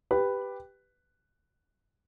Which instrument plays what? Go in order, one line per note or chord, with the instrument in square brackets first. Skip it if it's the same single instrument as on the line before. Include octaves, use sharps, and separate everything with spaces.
[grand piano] G4 B4